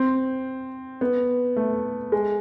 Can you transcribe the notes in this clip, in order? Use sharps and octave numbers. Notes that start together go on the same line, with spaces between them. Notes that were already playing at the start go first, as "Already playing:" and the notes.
Already playing: C4
B3
A3
G#3